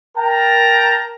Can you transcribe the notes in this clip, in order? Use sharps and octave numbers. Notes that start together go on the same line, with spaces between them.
A#4 G5 A5 A#5